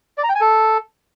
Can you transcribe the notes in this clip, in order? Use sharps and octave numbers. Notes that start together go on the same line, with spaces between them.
D5
A#5
G5
G#5
A4